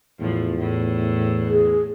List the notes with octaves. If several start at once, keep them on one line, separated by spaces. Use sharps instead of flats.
E2 A2 F3
A2
G#4